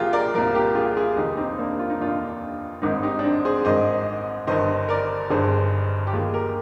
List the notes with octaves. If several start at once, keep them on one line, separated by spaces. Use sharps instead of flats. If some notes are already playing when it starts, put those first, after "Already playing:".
Already playing: C2 A#2 F3 F4 G4 G#4 A#4
A#4 D5
C2 A#2 F3 A#4 D5
G4 A#4
F4 G#4
F4 G#4
F1 D#2 D#3 D#4 G4
C4 D#4
A#3 D4
F4
D#4
F1 D#2 D#3 D4 F4
G#1 G#2 D#3 C4 D#4
D#4 G4
D4
C4 D#4
G#4 C5
G#1 G#2 D#3 C5 D#5
G1 G2 D#3 C5 D#5
A#4 D5
G1 G2 D#3 G#4 C5
G4
D#2 D#3 F4 G#4
G4 A#4